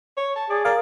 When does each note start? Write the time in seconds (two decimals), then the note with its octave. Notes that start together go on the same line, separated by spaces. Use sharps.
0.17 C#5
0.36 A5
0.50 G#4 D5
0.65 A#4 D5 F5